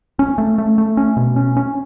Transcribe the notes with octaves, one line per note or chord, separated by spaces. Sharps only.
C#4
A3
A3
A3
C#4
B2
C#4
C#4